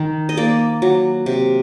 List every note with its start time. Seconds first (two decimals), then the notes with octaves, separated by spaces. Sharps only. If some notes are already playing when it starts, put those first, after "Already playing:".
Already playing: D#3
0.29 D#5
0.37 A#3 D5
0.82 F#3
1.26 C3